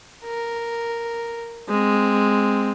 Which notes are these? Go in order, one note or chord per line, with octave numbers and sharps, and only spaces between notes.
A#4
G#3 C4